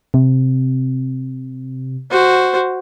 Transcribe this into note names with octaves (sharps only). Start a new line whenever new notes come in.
C3
F#4 C5